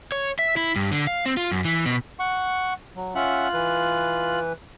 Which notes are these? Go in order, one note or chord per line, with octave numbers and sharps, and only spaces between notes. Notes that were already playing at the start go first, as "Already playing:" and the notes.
C#5
E5
E4
G2
D3
F5
C4
F4
F#2
E3
B2
F#5 C#6
F#3
C#4 F4 E5 F#5 F#6
E3 B4